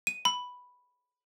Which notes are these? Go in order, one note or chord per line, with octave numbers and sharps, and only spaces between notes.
D#7
B5